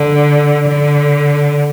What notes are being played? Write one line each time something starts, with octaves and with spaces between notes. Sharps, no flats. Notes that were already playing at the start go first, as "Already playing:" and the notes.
Already playing: D3
D3